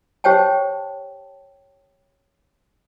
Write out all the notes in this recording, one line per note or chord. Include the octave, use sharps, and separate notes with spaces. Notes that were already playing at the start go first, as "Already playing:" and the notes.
G4 C5 C#5 G5 A5